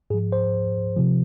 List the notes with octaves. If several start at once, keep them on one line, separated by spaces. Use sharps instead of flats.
G#2 F3 G#4
C5
C3 F3